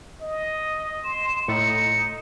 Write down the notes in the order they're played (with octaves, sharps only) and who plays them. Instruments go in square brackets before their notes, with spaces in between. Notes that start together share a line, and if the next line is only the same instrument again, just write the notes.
[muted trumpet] D#5
[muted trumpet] C6 [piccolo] E7
[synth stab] A2 [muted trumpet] D#4 [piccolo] C#7